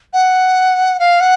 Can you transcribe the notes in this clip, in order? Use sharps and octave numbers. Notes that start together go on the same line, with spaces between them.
F#5
F5
F#5